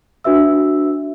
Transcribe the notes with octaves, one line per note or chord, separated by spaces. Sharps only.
D4 F#4 B4 E5 E6